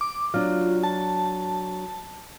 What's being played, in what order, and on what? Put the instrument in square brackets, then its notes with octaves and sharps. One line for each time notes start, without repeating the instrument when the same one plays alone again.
[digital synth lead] D6
[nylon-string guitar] F#3 D4 [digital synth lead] F4
[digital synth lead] A5